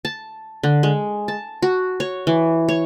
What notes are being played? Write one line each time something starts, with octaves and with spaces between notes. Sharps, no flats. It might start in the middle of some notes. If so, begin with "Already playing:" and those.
A5
D3
G#3
A5
F#4
C#5
E3
C#5